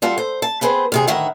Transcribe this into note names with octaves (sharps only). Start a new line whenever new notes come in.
G3 F4 A4 F#5
C5
A5
B3 C4 G#4 B4 C5
E2 C3 G#4
D2 A2 D#3 C#5 E5 F#5